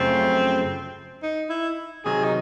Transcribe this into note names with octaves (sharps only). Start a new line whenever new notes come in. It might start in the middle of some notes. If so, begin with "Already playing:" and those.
Already playing: F#2 C#3 F3 A3 C4
D#4
E4
C3 D#3 F#3 G#4
D#4